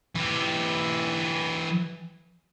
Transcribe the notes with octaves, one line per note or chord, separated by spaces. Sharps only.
E3 G4